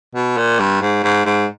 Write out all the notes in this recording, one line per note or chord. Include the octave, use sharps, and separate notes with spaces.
B2
A#2
G2
G#2
G#2
G#2